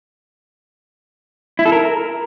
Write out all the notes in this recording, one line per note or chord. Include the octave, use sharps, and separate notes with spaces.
E4
A4
A#4